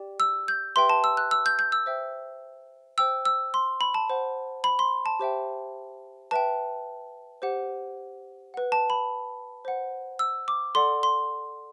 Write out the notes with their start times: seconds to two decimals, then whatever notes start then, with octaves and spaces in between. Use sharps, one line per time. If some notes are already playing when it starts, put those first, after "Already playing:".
Already playing: G4 D5 G5
0.20 E6
0.48 G6
0.76 G4 B4 E5 G5 C6
0.90 A5
1.04 E6
1.17 F#6
1.31 E6
1.46 G6
1.59 G6
1.72 E6
1.86 C5 E5 G5
2.98 C5 G5 E6
3.25 E6
3.54 C6
3.81 B5
3.94 A5
4.10 C5 F#5
4.64 B5
4.79 C6
5.06 A5
5.19 G4 C5 E5 G5
6.31 B4 E5 G5 A5
7.42 G4 C5 F#5
8.54 B4 F#5
8.72 A5
8.90 B5
9.65 C5 F#5
10.19 E6
10.48 D6
10.75 A4 D5 F#5 C6
11.03 C6